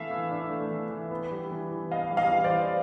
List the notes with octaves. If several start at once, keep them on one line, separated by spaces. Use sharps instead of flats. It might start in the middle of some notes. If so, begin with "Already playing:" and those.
Already playing: E3 A3 E5 F5
E3
D4
A3
E3
E3
B3
G3
E3
E3
B3 D#5 F5
G3
D#5 F5
E3
C5 D5
E3